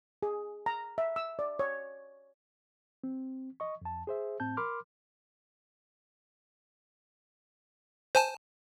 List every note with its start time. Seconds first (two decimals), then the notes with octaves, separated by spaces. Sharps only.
0.23 G#4
0.66 A#5
0.98 E5
1.16 E6
1.39 D5
1.59 C#5
3.04 C4
3.60 D#5 C#6
3.82 F2 A5
4.07 G#4 C5 E5
4.40 A2 C4 A5 G6
4.57 A#4 B5 C6 D6 F6
8.15 C5 G#5 A5